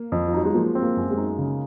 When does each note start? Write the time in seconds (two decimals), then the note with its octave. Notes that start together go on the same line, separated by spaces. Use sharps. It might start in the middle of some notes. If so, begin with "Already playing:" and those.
Already playing: A#3
0.12 F2
0.28 F3
0.33 F#3 D#4
0.45 G#3
0.54 F3 A#3
0.75 C4
0.83 A#3
0.97 F#2
1.10 G#3
1.17 D#4
1.38 C#3